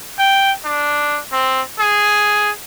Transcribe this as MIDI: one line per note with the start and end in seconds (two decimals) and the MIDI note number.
0.19 0.52 79
0.65 1.19 62
1.32 1.61 60
1.80 2.51 68